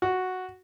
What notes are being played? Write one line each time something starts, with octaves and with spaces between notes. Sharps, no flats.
F#4